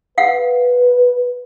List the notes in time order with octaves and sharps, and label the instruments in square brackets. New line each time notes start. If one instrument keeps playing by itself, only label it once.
[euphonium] B4 [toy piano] F5 F#5